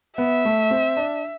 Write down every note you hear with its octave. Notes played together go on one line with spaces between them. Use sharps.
B3 E5
A3
C4
D4